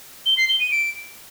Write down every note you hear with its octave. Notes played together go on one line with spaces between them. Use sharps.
G7
C7
G7
D#7
D7